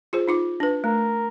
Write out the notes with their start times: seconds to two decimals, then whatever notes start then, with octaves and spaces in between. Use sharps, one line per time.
0.13 F4 G#4 C5
0.28 D#4 F4 D6
0.60 D4 B4
0.84 A3 A#4